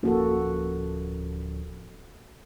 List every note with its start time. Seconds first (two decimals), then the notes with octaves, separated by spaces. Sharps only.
0.03 D1 F3 A#3 C#4 F#4 A4